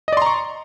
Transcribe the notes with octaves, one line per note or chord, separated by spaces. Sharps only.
D5 D#5 A#5 C6 C#6